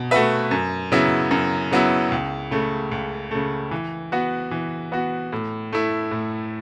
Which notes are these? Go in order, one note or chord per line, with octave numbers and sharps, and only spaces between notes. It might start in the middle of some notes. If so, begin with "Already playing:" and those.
Already playing: B2
A3 F#4 B4 E5
F#2
C#3 F#3 B3 E4
F#2
C#3 F#3 B3 E4
C#2
C#3 A3
C#2
C#3 A3
E3
B3 F#4
E3
B3 F#4
A2
A3 E4
A2